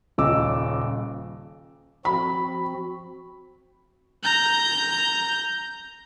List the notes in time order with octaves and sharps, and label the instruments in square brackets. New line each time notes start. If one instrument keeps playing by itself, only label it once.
[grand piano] D#1 C#3 D#5 D6 E6
[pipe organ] F3 C4 F#4 [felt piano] B5
[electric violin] A#5 G6